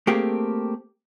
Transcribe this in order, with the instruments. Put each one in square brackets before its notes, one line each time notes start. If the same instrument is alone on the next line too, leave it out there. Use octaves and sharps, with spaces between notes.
[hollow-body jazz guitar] A3 A#3 C4 G4 G#4 A#4